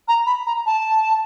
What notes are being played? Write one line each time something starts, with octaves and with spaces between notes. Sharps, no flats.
A#5
B5
A#5
A5